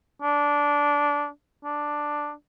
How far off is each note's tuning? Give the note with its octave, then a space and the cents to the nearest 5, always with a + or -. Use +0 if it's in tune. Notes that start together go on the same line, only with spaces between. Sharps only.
D4 -15
D4 +5